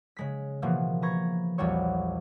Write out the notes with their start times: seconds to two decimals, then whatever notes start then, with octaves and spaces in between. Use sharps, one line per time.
0.17 C#3 G#3 B6
0.62 B2 E3 F3 G#3 A#3
1.02 B4 A#5 C#6 G#6
1.58 A#1 E2 G3 F#4 C#5 C#6